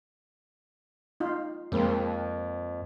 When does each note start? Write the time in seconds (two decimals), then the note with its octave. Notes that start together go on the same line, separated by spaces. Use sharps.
1.20 D#4 F4
1.72 F2 G#3 A#3 C4